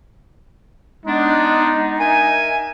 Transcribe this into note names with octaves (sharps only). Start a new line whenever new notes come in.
G#3 B3 D4 D#4
A#4 E5 G#5